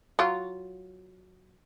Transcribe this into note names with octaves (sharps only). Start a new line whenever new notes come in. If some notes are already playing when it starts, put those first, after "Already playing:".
F#3 F4